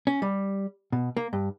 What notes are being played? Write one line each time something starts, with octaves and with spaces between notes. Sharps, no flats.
C#4
G3
B2
A#3
G2